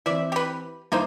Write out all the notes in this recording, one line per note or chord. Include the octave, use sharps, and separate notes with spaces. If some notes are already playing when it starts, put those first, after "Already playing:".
E3 C4 D5 E5
G4 B4
G2 A#3 D#4 E4 C5 D6